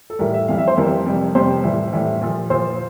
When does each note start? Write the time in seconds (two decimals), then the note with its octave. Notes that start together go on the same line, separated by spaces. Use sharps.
0.10 A4
0.19 A2 E3 G3 A#4
0.34 E5
0.48 F2 E3 G3 F5
0.58 E5
0.68 C5
0.77 F2 E3 G3 A#4
1.06 F2 C3 G3
1.35 F2 C3 G3 C5
1.63 A2 E3 G3
1.93 A2 E3 G3
2.22 A#2 F3
2.50 A#2 F3 C5